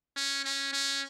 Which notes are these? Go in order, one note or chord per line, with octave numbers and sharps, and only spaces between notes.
C#4
C#4
C#4